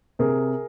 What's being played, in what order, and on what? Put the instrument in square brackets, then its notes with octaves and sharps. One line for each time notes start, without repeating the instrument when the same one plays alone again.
[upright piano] C3 G#4 A#4